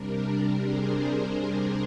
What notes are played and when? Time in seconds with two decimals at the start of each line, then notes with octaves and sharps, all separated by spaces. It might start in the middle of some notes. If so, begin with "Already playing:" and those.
Already playing: C3 G3 D4 A#4
0.61 G#4 C5